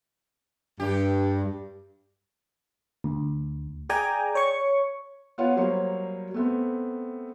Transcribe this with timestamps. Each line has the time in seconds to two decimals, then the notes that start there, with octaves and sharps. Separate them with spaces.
0.80 G2 G4
3.04 D2
3.90 G#4 D5 G5 G#5 A#5
4.35 C#5 C#6
5.38 B3 F4 C#5 F#5
5.57 F#3 G3 A#3 C5 C#5
6.34 A3 B3 C4